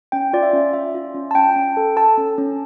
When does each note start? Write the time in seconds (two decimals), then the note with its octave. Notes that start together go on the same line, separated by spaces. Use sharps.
0.12 C#4 G5
0.33 F4 D5
0.43 E5
0.53 C#4
0.73 C#4 E5
0.94 F4
1.15 C#4
1.31 A5
1.35 C#4 G5
1.56 C#4
1.77 A4
1.97 A4 A5
2.17 C#4
2.38 C#4